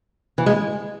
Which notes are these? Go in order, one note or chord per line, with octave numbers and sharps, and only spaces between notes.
E3
G#3